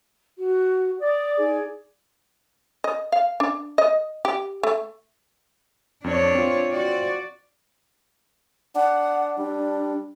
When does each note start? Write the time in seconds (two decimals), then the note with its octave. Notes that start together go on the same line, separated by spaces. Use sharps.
0.38 F#4
1.01 D5 D6 D#6
1.38 D#4 G#4
2.84 D#5
3.12 F5
3.40 D4
3.78 D#5
4.25 G4
4.63 A3
6.04 F2 D4 C#5
6.35 C4 F4
6.72 F#4 D5
8.76 D4 F#5
9.38 G3 D4